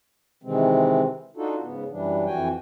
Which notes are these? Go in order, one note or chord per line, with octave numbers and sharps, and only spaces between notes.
C3 D#3 E3 G#3 C4
D4 D#4 F4 F#4 A4
G#2 C#3 B3
F#2 E3 G3 D4
F2 E3 F#4 G5 G#5